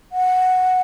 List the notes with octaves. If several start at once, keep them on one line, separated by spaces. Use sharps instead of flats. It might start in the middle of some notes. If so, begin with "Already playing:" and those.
F#5